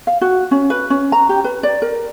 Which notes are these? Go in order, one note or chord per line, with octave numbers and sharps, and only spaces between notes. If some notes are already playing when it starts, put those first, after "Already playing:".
F5
F#4
C#4
B4
C#4
A#5
G4
B4
D5
A#4